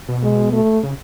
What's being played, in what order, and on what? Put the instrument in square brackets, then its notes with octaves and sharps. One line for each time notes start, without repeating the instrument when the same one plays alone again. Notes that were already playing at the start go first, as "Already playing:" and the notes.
[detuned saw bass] B2
[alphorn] G#3
A3
[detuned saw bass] C#3